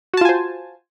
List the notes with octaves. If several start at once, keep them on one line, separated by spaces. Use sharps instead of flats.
F4 F#4 C5 G#5 A5